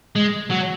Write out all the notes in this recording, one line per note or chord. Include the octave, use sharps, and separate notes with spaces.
G#3
F#3